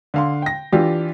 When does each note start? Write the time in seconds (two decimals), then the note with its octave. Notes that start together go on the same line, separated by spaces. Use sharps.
0.14 D3 F5 C6
0.42 G5 A#6
0.72 E3 D4 F4 G4